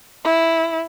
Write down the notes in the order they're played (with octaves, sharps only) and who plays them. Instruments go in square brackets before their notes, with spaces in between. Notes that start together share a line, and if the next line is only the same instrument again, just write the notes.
[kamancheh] E4